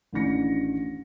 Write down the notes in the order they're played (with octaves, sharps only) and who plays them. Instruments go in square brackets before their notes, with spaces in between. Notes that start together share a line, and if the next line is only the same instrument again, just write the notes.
[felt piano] A1 D#3 C#4 D4 A#6 C#7